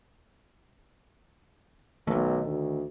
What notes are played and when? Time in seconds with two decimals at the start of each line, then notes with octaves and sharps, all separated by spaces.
2.07 B1 D#3 A3
2.45 D2